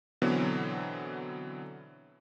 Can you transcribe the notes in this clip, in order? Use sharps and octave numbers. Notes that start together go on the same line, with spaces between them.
B2 D3 E3 F#3 B3 C4